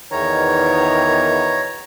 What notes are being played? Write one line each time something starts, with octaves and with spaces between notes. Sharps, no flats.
E2 B2 D#3 C#5 A#5